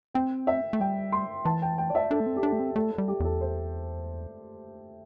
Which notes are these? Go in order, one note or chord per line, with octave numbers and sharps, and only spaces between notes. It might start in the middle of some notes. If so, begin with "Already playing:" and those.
C4 G5
E5
A3
G3 G5
C6
E3 A5
G5
G5
D5
E5
D4 A4
A3
C4
G4
D4 A4
A3
C4
A3 A4
A4
G3
G4
E2 A4
C5